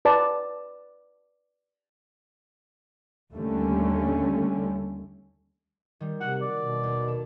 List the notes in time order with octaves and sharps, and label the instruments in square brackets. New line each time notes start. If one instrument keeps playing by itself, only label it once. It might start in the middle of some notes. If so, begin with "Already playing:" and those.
[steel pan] B4 D5 A5
[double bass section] D#2 D3 G3 A3 C#4
[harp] D#3 G3
[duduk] C3 [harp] A#3 F#4 [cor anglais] F#5
[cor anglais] D5
[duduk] B2
[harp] D#2
A4